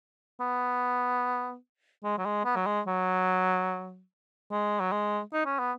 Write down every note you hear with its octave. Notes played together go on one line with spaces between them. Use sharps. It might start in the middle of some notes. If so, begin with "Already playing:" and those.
B3
G#3
F#3
G#3
B3
F#3
G#3
F#3
G#3
F#3
G#3
D#4
C#4
B3